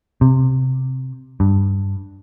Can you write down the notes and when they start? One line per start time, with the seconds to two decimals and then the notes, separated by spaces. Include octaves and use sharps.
0.21 C3
1.40 G2